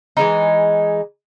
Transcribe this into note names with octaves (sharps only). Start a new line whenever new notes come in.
E3 G#3 D#4